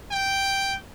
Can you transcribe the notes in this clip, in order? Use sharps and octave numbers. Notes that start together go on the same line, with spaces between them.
G5